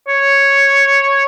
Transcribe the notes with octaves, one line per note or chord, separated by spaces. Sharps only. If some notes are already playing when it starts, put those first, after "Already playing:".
C#5